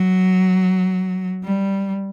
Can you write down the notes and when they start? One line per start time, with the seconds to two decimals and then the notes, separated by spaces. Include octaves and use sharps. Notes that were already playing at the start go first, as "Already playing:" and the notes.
Already playing: F#3
1.43 G3